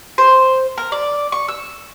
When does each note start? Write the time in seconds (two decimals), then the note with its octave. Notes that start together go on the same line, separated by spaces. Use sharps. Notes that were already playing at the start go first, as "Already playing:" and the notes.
0.18 C5
0.78 A#4
0.92 D5
1.32 C#6
1.49 E6